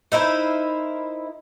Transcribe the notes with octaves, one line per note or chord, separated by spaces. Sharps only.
D#4 E4 A#4 C5